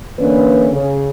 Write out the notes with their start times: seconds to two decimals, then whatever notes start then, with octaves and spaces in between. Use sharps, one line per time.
0.19 D3 E3 A#3 C#4 D4 B4
0.72 C#3